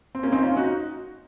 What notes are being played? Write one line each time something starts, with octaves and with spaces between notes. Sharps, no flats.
C4
A#3 C#4
C4 D#4
C#4 F4
D#4 F#4